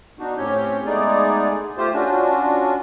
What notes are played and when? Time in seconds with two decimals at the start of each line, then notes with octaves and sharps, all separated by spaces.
0.19 B3 D4 D#4 F#4
0.38 A2 C4 C#4 G4 C#5 G6
0.86 G#3 A3 B3 D#4 G#4 D5
1.77 A3 F4 G4 C5
1.93 C#4 D4 F4 F#4